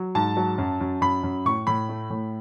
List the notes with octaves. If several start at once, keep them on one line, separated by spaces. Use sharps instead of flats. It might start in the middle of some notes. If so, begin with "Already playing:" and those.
Already playing: F#3
G#2 A5
F#3
F#2
F#2
F#2 B5
F#2
A2 C#6
A2 B5
A3
A2